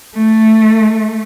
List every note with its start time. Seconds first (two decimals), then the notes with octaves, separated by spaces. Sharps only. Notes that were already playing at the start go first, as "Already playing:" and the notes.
0.16 A3